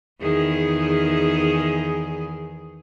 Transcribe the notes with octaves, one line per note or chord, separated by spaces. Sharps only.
E2 D#3 G#4